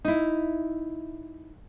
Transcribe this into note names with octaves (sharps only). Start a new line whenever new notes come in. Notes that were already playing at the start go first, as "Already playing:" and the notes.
D#4 E4